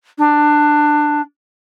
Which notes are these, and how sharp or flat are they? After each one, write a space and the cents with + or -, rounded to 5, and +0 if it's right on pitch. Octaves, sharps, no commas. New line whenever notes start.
D4 +15